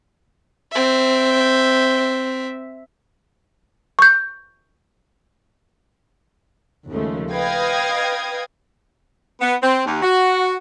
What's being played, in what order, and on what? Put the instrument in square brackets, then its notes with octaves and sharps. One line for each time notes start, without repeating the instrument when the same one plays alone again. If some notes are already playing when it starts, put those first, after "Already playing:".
[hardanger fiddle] C4 E5
[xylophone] C#6 G6
[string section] D#2 C#3 F3 G#3 A3
B4 D#5 F5 G5 D#6 G#6
[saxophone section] B3
C4
D#2
F#4